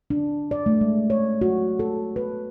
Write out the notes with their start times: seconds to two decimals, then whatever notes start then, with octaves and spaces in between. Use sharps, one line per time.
0.10 D4
0.51 D5
0.66 A3
0.81 G#3
1.10 C#5
1.41 F#4
1.79 A4
2.16 B4